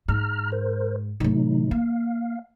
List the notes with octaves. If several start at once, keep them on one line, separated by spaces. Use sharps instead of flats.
G#2 A#5 F6
A#4 C5
A2 C3 E3 F#3 D#4
A#3 F5